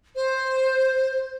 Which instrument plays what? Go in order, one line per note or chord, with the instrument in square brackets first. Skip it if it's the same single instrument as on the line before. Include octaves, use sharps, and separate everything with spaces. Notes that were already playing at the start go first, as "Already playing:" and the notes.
[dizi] C5